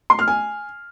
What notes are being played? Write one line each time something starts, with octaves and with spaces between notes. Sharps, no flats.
C6
F6
G#5